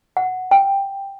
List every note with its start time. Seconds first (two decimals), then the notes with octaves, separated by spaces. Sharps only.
0.17 F#5
0.51 G5